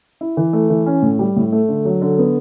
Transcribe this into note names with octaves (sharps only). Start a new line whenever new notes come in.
E4
E3
A3
E3
C#4
A2
G3
A2
A3
D3
F#3
D3
B3